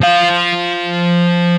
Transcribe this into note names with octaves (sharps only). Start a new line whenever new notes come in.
F3 F5